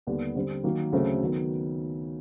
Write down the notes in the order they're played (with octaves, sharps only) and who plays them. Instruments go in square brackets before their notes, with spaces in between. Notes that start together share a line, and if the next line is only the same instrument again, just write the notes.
[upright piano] D#2 D3 G3 B3 D4
D3 G3 C4
D#3 F#3 A#3
D2 C#3 F#3 A3 C4
D#3 F#3 B3